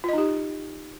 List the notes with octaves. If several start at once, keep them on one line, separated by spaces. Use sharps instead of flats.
D#4 F4 G4 D#5